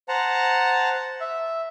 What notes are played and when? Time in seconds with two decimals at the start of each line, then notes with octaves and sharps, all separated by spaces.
0.08 C5 F#5 A5 A#5
1.20 E5